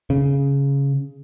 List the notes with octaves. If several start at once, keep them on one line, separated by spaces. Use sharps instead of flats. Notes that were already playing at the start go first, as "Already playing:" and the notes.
C#3